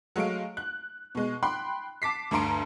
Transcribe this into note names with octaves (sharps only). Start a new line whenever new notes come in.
F#3 G#3 A3 F5 D7
F#6
B2 G#3
G5 B5 C6 F#6
A5 D6 B6 C7
D2 G2 A#5 C6 D7